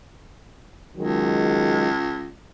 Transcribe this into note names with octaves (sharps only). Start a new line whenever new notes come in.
C#2 D#3 F#3 G#3